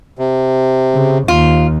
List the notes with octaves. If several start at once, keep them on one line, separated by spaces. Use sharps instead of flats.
C3
C#3
D#2 F4